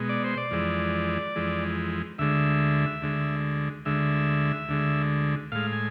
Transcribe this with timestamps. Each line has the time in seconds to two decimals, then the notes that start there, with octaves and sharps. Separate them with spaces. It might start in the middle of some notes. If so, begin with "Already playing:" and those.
Already playing: B2 G#3
0.09 D5
0.24 C5
0.37 D5
0.51 F2 E3 G#3
1.36 F2 E3 G#3
2.19 D2 D3 G#3 E5
3.02 D2 D3 G#3
3.86 D2 D3 G#3 E5
4.69 D2 D3 G#3
5.52 A2 G#3 F5
5.73 G#5